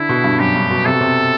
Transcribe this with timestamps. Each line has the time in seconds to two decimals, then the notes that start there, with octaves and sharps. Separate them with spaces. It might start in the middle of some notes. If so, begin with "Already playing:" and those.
Already playing: D3 E4
0.09 B2
0.24 G2
0.39 F#2 G4
0.55 G2
0.70 B2
0.86 C3 A4
0.93 B2
1.01 C3